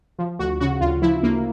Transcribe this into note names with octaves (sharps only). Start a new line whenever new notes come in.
F3
D2 F#4
C#3 F#4
D2 F4
F3 E4
D2 A#3